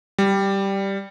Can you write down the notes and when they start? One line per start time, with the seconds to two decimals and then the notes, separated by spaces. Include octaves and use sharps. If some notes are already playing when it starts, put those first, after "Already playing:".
0.18 G3